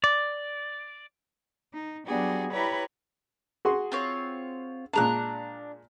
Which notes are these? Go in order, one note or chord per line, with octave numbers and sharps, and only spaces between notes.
D5
D#4
F#3 G3 B3 D4 F#4 G#4
E4 G4 B4 C#5 A#5 B5
F#4 G#4 C6
C4 F4 C#5
A#2 G#3 D4 A5 A#5 F#6